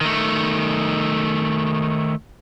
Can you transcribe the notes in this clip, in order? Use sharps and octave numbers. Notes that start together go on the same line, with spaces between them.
D#3 A3